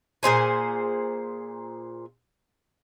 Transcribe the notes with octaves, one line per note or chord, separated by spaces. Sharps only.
A#2 G#4 C5 G#5